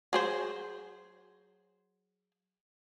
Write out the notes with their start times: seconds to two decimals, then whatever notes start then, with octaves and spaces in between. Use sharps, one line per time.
0.13 F#3 G#4 C5